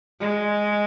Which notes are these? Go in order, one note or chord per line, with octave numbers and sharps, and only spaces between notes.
G#3